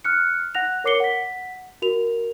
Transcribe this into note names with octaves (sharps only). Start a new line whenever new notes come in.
F6 F#6 C#7
F#5 F#6 A#6 F7
A#4 C#5 D6 C7 C#7 G7
F#5 B6
F#4 A#4 F7